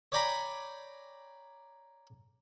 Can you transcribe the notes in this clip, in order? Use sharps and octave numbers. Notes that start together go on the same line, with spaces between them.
C#5 D5 G5 G#5 A#5 B5